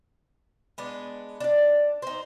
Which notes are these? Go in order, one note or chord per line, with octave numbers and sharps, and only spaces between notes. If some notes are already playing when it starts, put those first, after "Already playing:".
G#3 B3 D4
D4 D5
D#4 C5